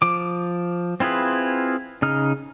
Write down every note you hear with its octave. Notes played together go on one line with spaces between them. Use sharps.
F3 D6
C4 E4 F4 G#4 B4
C#3 D#4 F6